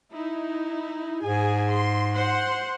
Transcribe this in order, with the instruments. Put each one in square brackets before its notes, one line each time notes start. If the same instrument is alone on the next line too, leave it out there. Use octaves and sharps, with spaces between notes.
[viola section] D#4 E4
[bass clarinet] G#2 [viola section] G#4 G#5
[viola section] C6
C5 F#5 C6